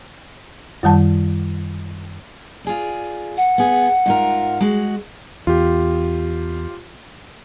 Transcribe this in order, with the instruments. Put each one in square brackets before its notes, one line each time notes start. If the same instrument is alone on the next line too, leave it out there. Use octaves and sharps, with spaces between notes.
[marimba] F#2 D#3 G3 A5
[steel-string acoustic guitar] F4 G#4 D5
[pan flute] F#5
[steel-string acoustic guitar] B3 G#4
G#2 F4 A#4
G#3 F#4
[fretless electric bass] E2 [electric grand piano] F4 G4